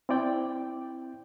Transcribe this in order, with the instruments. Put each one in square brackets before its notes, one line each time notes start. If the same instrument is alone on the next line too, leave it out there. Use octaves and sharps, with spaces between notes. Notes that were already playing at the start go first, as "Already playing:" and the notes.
[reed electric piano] C4 E4 D5 G5